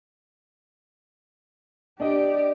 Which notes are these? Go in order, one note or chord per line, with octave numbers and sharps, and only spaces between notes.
D4 G4 D5 D#5